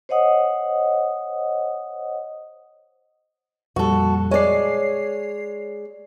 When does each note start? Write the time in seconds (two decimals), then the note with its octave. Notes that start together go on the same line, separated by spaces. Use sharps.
0.09 C5 C#5 D#5 F#5 D#6
3.76 F2 A#2 G3 F#4 A4
4.31 G#3 C#5 D5 C7